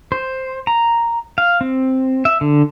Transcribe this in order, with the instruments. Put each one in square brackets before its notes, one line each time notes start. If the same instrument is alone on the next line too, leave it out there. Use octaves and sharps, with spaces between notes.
[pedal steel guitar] C5
A#5
F5
C4
E5
D3